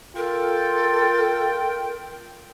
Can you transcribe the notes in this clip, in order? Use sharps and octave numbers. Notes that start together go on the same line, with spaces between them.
F4 A4 A#4 G5